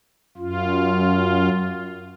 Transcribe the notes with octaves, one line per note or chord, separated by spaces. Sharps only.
F#2 F4